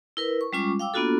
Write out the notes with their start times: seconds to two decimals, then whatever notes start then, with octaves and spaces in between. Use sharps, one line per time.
0.17 E4 A#4 B4
0.41 C#6
0.53 G3 G#3 C#4 F4 C#6 D6
0.79 F5 G5 D6 E6
0.94 A#3 B3 D4 F4 F#4 A4